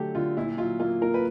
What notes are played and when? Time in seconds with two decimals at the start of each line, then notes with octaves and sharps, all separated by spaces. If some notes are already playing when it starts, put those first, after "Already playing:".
Already playing: D3 F#3 A3 G4 A4
0.15 D3 F4
0.37 A#2 E4
0.57 F#3 F4
0.80 A#3 F4
1.01 A#2 A#4
1.14 B4